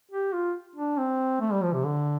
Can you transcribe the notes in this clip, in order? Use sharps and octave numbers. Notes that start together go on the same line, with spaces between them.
G4
F4
D4
C4
A3
G3
F3
C3
D3